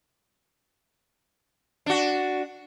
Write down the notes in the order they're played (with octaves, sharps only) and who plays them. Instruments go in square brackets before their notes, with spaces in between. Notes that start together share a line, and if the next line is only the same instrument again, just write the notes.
[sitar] D4 F#4